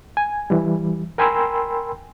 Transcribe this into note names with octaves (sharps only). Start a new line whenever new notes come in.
G#5
E3 G3
A#4 G5 G#5 B5 C6 E6